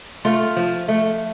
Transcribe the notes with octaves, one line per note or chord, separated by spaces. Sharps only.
A3 F4
F3
A3